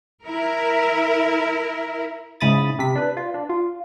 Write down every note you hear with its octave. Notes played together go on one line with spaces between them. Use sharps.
E4 A#4
G#2 C#3 E4 B5 D#6 A6
C3 B6
D4 B4
F4
D4
F4